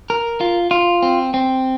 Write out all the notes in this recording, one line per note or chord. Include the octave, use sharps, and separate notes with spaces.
A#4
F4
F4
C4
C4